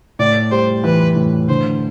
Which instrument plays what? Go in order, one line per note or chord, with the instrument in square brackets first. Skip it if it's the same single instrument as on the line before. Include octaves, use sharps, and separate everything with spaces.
[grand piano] A2 [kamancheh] D5
[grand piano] G3 [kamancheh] C5
[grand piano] E3 [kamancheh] B4
[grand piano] A2
[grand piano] D3 [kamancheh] C5